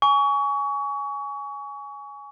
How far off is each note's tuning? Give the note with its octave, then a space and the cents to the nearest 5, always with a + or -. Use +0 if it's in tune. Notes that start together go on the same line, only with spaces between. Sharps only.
G#5 +0 C#6 +30